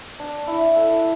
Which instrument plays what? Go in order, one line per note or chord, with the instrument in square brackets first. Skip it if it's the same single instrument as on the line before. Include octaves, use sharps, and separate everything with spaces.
[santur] D4
E4
A4